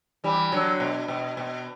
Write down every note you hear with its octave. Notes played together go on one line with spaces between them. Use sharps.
E3 G3
D3 F#3
B2
B2
B2